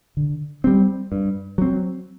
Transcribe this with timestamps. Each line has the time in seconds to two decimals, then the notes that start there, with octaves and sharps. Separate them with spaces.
0.17 D3
0.64 G3 C4
1.12 G2
1.58 F#3 C4